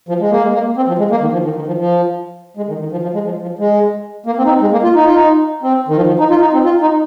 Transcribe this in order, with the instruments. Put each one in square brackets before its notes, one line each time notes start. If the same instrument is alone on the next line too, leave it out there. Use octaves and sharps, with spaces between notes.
[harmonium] F3
G#3
A#3
G#3
A#3
C4
F3
G#3
A#3
D#3
F3
D#3
D#3
F3
F3
G#3
D#3
D#3
F3
F3
G#3
F3
F3
G#3
A#3
C4
D#4
C4
G#3
A#3
F4
D#4
F4
D#4
C4
D#3
F3
F3
D#4
F4
D#4
C4
F4
D#4